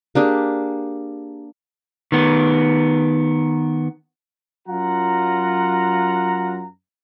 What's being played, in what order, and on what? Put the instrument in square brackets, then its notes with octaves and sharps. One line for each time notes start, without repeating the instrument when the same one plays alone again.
[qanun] A#3 D4 G4 G#4
[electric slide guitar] D#3 B3
[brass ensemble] F#2 F#3 F4 F#5 A#5